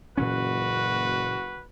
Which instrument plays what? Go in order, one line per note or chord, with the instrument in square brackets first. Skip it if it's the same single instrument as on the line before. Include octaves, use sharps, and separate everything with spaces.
[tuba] F#1 [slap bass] A#2 E3 C#4 [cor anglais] F#4 [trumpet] B4